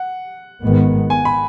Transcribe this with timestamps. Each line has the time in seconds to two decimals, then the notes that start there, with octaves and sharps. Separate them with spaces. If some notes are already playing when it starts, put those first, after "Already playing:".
Already playing: F#5
0.63 G#1 G#2 D#3 G#3 B3
1.10 G#5
1.25 B5